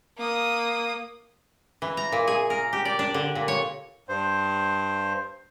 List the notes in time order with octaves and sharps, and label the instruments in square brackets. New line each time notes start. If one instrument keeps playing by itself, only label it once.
[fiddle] A#3 D#6
[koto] E3
A#5
A#2
G#4
A#4
G4
D5
D4
D3
A#2
C#5
[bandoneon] G2 C5